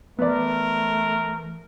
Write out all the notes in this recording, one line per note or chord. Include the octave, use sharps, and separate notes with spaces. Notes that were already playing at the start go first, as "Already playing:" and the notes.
E3 A3 B3 A#4 D5